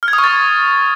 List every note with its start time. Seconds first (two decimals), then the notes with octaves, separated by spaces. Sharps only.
0.03 F6
0.08 G#6
0.13 D#6
0.18 C#6
0.24 A6